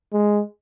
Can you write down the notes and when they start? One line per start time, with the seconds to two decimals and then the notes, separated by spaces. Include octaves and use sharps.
0.13 G#3